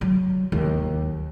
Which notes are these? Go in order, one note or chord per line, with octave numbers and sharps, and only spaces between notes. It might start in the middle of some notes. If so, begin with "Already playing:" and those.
F#3
D#2